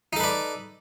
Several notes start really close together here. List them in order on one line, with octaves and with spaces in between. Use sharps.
D#4 A4 B4 D5